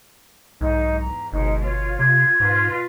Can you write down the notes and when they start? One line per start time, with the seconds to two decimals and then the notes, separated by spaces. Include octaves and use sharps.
0.61 B1 G#2 D#4
1.00 E2 A#5
1.33 G1 B2 G#3 D#4
1.64 F4 C#5
1.99 C3 G#6
2.40 G#2 B2 F4 B4